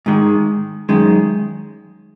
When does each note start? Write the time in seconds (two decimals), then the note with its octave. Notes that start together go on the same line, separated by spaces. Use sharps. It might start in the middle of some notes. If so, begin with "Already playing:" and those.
0.06 G#2 D#3 G#3
0.89 F#2 D#3 G#3